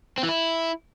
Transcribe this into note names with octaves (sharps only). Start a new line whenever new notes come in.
C4
E3
E4